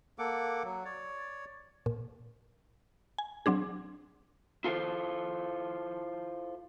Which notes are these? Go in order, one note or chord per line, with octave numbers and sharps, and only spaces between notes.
A#3 A4 F#5 D6
F#3
C#5 D5
A#2
G#5
F#3 C4 D4 G#4
E4 F4 A4 A#4 C5